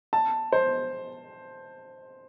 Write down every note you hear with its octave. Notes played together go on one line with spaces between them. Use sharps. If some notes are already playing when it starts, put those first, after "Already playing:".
A5
C5